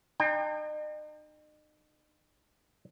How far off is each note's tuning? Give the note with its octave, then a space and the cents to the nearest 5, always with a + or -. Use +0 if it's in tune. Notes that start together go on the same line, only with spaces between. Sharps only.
D#4 -40 G5 +30